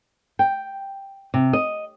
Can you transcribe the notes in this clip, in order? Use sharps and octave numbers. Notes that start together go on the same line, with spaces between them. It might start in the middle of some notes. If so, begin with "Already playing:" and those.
G5
C3
D#5